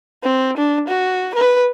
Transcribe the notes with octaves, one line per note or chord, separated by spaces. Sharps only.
C4
D4
F#4
B4